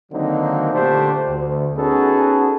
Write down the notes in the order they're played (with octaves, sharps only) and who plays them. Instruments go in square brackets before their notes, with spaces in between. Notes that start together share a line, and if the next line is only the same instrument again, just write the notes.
[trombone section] D3 D#3 F#3 A#3 C4 D#4
A#2 D3 A3 D4 G4 C5
D2
B3 C#4 D#4 F#4 G#4 A4